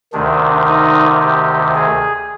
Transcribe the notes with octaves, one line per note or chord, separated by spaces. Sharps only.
D2 C3 D#3 D4
D#4
G4
G#4